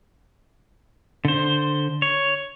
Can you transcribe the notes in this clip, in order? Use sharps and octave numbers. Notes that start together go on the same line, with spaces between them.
D3 C5
C#5